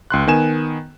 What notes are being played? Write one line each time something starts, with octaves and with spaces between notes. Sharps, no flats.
C#2 C6 F#6
D#3 B3 G#5 E7